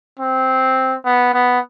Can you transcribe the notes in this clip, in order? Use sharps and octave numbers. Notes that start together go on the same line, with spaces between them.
C4
B3
B3